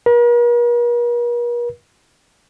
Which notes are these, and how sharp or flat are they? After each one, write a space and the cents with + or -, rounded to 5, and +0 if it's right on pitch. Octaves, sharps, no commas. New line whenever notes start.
A#4 +45